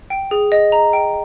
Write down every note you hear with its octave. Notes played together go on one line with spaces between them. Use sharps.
G5
G#4
D#5
A#5
G5